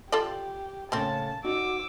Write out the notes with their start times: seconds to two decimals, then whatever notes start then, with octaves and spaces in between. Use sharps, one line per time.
0.12 F4 G4 A4 D5
0.92 A2 C#3 A#3 C4 A5
1.44 D#4 F#4 D6 E6